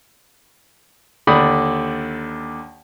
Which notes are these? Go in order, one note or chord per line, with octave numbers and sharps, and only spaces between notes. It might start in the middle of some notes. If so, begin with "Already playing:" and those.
D#2 D3 D5 B5 D#6